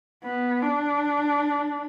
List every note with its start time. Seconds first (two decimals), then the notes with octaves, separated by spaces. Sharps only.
0.24 B3
0.62 D4